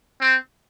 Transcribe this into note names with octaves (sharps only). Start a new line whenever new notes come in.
C4